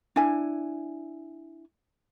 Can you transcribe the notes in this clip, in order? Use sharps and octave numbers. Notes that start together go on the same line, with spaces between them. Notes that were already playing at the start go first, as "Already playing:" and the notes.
D4 E4 G#5